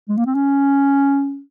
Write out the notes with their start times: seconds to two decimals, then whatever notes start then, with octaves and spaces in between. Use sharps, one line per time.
0.09 G#3
0.17 A#3
0.27 C4
0.35 C#4